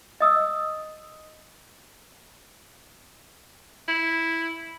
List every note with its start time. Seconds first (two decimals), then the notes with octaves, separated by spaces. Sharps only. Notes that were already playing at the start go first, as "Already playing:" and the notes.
0.20 D#5 D#6 E6
3.88 E4